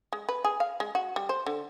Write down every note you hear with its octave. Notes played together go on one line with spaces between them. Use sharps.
G#3
B4
G#4
F5
G#3
F#4
G3
C5
D3